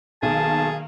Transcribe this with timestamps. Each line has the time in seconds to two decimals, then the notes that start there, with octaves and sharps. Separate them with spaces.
0.22 B1 D#3 A#3 G#4 A5